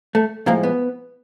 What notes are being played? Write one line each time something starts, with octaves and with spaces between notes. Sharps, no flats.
A3
A2 F3 G#3 A#3
B3